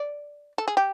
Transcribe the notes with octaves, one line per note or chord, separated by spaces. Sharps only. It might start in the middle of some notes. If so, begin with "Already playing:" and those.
Already playing: D5
A4
G#4
G4